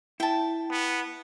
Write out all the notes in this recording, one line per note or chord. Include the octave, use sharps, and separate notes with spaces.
E4 G5 A5
B3